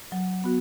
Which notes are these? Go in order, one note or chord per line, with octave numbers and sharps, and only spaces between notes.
F#3
B3 F#4